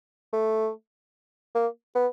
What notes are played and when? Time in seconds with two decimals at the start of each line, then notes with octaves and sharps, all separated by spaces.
0.33 A3
1.55 A#3
1.95 B3